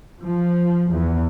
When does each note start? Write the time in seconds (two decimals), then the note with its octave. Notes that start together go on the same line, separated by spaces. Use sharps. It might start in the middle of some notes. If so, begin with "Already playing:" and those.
0.22 F3
0.91 E2